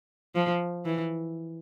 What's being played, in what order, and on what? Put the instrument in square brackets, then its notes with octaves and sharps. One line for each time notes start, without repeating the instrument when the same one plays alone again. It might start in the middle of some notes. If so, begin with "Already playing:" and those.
[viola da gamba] F3
E3